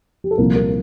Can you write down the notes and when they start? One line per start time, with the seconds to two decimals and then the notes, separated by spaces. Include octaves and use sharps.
0.24 G4
0.31 A4
0.38 C2 A#2 F3 A#3 C4 A#4
0.55 A#3 A#4